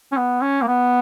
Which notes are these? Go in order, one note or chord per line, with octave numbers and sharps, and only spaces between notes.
C#4
B3
C#4
A#3
B3